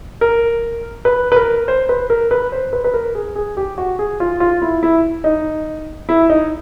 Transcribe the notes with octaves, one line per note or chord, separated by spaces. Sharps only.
A#4
B4
B4
A#4
C5
B4
A#4
B4
C5
B4
B4
A#4
G#4
G#4
G4
F#4
G#4
F4
F4
E4
E4
D#4
E4
D#4